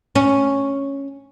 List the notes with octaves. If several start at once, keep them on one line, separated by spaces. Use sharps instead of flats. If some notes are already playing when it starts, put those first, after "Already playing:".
C#4